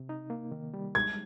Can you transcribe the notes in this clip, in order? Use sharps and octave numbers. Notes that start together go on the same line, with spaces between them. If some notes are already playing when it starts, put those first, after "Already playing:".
Already playing: C3
D#4
A#3
D#3
G3
G#3 G#6